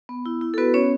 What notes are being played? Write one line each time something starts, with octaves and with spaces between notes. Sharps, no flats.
B3
E4
E4
A4
B3 F#4 B4
B3 C#4 C#5